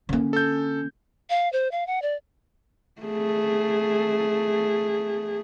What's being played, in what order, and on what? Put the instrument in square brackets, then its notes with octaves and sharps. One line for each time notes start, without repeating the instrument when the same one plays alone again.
[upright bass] D3 A#3 [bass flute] C#4
[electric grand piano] A4 G6
[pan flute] F5
C5
F5
F#5
D5
[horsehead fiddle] A3 G#4